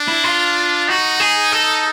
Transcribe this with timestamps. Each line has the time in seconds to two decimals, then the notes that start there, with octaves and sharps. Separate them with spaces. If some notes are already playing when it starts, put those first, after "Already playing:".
Already playing: D4
0.08 E4
0.24 F4
0.88 D#4 F#4
1.20 G#4
1.52 A4